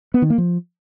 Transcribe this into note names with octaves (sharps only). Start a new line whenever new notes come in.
B3
D#3
A#3
F3